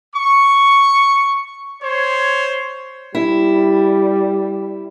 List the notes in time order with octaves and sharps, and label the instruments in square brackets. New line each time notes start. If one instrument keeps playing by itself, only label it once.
[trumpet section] C#6
C5 C#5
[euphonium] G3 [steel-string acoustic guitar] E4